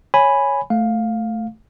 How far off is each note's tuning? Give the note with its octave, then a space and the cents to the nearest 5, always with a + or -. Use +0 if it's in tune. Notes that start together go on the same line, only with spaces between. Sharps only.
C#5 +0 G#5 +0 B5 +0
A3 +0 F5 +10